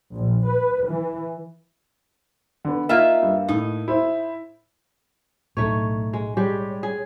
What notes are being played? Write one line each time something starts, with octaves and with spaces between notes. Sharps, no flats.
A#1
B4
E3
D3 B3
A#3 D#4 F4 E5
G2
A2 D#4
E4 C5 E5
B1 A2 A3 D#4 C#5
G#3
G3 G#3 G4 C#5
G#4